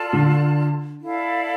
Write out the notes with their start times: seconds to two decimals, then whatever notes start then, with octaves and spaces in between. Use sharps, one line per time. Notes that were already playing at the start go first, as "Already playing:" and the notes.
Already playing: F4 A4 D5 A5
0.13 D3
1.01 E4 A4 D5 F5